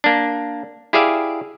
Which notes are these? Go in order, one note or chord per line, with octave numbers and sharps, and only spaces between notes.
A#3 D4
E4 G4 G#4 D5 E5 F5